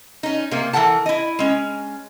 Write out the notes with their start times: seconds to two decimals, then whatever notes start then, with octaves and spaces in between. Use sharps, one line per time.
0.23 C#4 D#4
0.51 C3 A#3
0.73 E3 A4 A#4 F#5 A5
1.06 E4 D#5
1.39 G#3 C#4